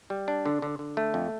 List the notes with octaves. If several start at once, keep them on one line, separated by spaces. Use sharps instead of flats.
G3
D4
D3
D3
D3
A3
F2